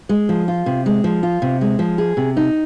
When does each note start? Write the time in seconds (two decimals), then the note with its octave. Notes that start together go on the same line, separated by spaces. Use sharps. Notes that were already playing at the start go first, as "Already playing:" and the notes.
0.09 G#3
0.29 F3
0.48 F4
0.66 C3
0.86 G#3
1.04 F3
1.23 F4
1.42 C3
1.61 G#3
1.79 F3
1.98 G#4
2.17 C3
2.37 D#4